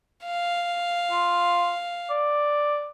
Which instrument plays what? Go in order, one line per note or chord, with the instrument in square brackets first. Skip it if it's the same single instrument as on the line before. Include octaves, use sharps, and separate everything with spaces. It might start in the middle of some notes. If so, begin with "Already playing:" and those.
[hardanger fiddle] F5
[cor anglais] F4
D5